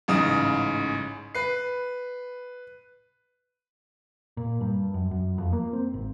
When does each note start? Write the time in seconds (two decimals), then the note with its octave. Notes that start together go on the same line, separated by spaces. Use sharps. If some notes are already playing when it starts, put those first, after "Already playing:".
0.08 A1 G#2 C#3 D#6
1.35 B4 C7
4.37 A#2
4.61 G2
4.94 F#2
5.11 F#2
5.38 F2
5.53 A#3
5.73 C4
5.94 G#1